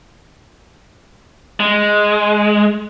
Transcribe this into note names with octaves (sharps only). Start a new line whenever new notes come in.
G#3